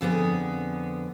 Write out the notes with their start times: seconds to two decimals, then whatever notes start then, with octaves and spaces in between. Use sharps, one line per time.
0.01 F2 D3 B3 G#4